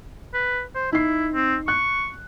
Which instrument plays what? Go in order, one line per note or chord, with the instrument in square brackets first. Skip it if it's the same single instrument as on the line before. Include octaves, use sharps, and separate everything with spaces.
[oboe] B4
C5
[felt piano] D#4 C7 [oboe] E4
[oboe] C4
[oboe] C#6 [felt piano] F#6